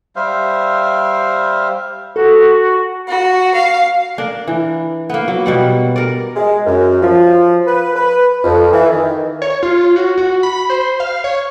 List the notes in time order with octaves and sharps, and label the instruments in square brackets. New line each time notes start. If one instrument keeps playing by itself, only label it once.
[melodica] G3 C5 E5 F5
[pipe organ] F#4 [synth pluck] A4
[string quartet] F#4
F5
[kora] D4 A#4
E3
A#3 B3
F#3
B2 G3 F#5
A#4 D5
[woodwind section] G#3
F#2
F3
B4
B4
F2
E3
D#3
[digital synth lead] C#5
F4
F#4
F#4
B5
C5
F5
C#5